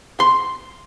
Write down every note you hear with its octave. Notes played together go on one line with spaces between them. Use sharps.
C6